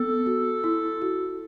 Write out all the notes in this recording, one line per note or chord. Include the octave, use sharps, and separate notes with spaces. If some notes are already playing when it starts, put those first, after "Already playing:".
Already playing: B3 A4
F#4
E4
F#4